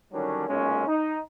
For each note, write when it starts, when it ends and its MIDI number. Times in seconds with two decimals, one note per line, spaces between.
0.12 0.46 50
0.12 0.46 51
0.12 0.46 54
0.12 0.46 55
0.12 0.46 61
0.12 0.46 62
0.47 0.85 35
0.47 0.85 46
0.47 0.85 56
0.47 0.85 61
0.86 1.18 63